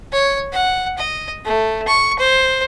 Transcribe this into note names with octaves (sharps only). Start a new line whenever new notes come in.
C#5
F#5
D#5
A3
C#6
C5